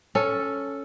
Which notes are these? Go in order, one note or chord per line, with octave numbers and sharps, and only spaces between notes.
C#4 A4